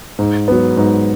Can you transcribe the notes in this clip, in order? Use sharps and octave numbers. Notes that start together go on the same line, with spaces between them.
G#2
F#3 B3
G#2